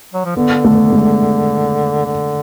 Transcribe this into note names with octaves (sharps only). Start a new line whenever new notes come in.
F#3
F3
D3 B3
A3
G#3
D3